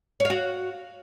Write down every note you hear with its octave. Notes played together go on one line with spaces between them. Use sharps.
F#4 C#5 F5